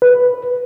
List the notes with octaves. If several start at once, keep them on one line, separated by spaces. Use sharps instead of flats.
B4